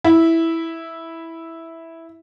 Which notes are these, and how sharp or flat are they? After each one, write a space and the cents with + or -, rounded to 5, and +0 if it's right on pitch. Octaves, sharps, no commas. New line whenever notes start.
E4 -5